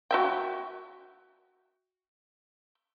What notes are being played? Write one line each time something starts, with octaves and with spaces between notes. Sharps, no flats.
F#4 E5 G5